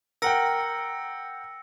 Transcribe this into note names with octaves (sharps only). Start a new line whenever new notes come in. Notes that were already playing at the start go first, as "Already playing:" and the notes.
A#4 F#5 G5 E6 A#6 C#7